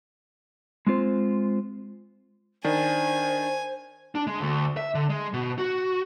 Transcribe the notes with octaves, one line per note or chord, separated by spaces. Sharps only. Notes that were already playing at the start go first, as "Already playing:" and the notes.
G#3 C4 F4 C5
D#3 D4 C5 G#5
D4
G#3
D2
E5
D3
G#3
B2
F#4